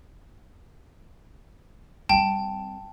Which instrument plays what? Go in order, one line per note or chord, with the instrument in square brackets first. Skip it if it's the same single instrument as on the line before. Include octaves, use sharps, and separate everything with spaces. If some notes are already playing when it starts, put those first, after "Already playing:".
[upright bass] G3 C4 [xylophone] G5 A5